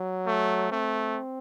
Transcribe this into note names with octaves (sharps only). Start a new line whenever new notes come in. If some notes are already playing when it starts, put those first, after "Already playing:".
Already playing: F#3
A3
A3 C4